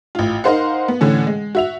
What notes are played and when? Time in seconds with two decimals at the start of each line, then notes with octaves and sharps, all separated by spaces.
0.15 A1 F4
0.44 D#4 A#4 C5 F5 F#5
0.88 B3
1.01 A2 D3 E3 C#4
1.27 G#3
1.55 F#4 E5 F7